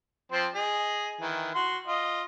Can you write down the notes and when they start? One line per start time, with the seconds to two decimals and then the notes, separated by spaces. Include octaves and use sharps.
0.32 F3 C4 C5
0.55 G#4 D#5
1.21 D#3 E3
1.55 F#4 C6
1.87 F4 D#5